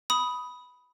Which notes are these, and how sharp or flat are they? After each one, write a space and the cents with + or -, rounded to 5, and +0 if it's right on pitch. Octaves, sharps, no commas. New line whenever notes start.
B5 +0 D#6 +15